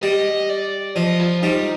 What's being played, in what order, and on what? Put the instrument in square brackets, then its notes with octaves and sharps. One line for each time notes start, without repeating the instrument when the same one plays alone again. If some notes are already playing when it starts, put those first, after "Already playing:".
[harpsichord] G3 [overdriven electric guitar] D#5
[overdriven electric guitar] D5
[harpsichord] F3 [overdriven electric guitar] D#5
[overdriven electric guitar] F4
[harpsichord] G3 [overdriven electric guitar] D#4